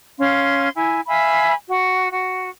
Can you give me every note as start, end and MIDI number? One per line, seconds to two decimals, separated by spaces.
0.19 0.69 61
0.19 0.69 77
0.19 0.69 84
0.75 1.01 64
0.75 1.01 80
1.07 1.52 76
1.07 1.52 77
1.07 1.52 80
1.07 1.52 83
1.69 2.07 66
2.12 2.49 66